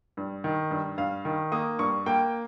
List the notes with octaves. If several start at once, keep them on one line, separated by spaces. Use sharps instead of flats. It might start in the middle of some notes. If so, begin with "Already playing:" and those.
G2
D#3
G2
G2 F5
D#3
A#3 D#6
G2 C#6
A#3 G5